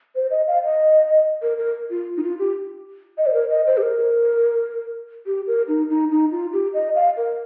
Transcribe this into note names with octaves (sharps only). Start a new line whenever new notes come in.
C5
D#5
F5
D#5
A#4
A#4
F4
D#4
F4
G4
D#5
C5
A#4
D#5
C5
G4
A#4
G4
A#4
D#4
D#4
D#4
F4
G4
D#5
F5
A#4